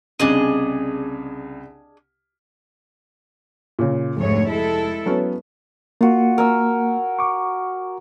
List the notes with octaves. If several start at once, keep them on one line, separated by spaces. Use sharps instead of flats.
C2 C#3 D4 G#4 D#5
A#2 C#3
F1 D2 G#2 C#5
G#3 E4 A4
F#3 B3 C#4
A#3 F4 F#4
A#4 G#5 E6
C#6 D6